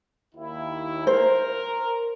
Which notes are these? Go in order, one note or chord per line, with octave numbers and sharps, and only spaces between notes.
D#2 E4
A#4 C5